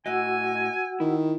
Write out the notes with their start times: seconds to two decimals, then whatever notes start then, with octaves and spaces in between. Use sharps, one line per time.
0.06 A2 F#4 D#5 F#5 G#5 E6
1.00 D#3 E4